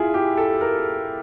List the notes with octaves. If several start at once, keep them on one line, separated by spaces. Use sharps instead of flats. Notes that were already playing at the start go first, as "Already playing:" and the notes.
Already playing: E4 F4 G#4
G4
A4
A#4